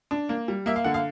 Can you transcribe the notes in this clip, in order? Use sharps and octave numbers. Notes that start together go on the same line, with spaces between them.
D4
A#3
G3
A#3 E5
F5
D3 F#5
F5